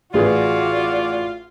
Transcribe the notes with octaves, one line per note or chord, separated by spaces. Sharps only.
A1 F4 F#4 G#4 B4 D5